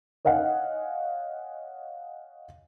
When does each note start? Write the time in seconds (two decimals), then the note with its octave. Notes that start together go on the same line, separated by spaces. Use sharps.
0.25 C#5 D#5 F5 F#5 G#5